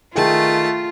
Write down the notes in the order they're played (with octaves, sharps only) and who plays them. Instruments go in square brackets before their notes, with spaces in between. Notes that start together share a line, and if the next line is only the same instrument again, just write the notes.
[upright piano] D#3 G#4 [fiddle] A3 A5 [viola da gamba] F4